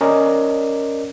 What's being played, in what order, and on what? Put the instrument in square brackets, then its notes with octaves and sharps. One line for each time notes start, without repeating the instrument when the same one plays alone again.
[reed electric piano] C#4 A#4 D5 D#5